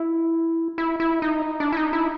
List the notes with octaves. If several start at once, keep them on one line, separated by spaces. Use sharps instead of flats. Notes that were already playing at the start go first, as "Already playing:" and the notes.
Already playing: E4
E4
E4
D#4
D4
E4
D#4
E4